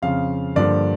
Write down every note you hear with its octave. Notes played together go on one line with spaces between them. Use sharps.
F2 C#3 F3 F5
G2 D3 F3 A#3 D5